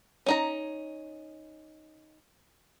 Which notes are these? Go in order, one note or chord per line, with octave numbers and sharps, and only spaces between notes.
C#4 D#4 A#5